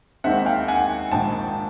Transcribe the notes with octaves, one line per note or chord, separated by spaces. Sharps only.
D#2 D#3 G#3 C4 E5 F#5
F5 G5
F#5 G#5
A#1 G#2 D#3 G5 A5